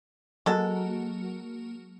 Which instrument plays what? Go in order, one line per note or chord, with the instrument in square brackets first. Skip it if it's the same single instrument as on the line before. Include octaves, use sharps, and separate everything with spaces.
[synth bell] F#3 A#3 F#4 [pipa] G#3 A4